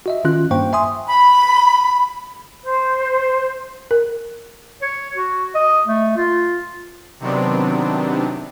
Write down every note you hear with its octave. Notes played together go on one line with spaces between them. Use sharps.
F#4 D#5 E5
D#3 C#4 F4 F#6
G2 A#3 C5 G5 C#6
E5 G#5 C6 D#6
B5
C5
A#4
C#5
F#4
D#5
A3
F4
C3 D#3 F#3 B3 C4 D4